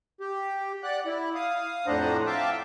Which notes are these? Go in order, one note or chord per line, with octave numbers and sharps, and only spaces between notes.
G4
D5 F#5 F#6
E4
F5 D#6
F2 A2 D4 C5 F#5 A#5
E5 F5 G5 A5 D6